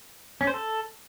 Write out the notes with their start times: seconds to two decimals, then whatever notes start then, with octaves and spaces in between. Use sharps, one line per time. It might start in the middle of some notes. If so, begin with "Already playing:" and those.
0.41 C#4
0.47 C5
0.54 A4